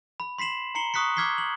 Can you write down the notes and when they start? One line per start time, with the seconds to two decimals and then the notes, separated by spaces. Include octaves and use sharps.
0.20 B5
0.38 C6 B6 C7 E7 F#7
0.75 A#5 C7 C#7 F#7 G7
0.94 C#6 D#6 F#6 B6 C#7
1.16 D6 F6 G#6 B6 C7 G7
1.38 F#7